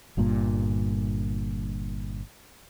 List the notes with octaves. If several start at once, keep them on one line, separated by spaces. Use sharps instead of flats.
G1 G2 A#2